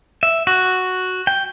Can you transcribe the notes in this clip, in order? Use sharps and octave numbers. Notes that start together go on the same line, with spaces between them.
E5
F#4
G5